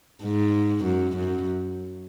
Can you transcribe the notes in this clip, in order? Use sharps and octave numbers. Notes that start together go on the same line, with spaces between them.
G#2
F#2
F#2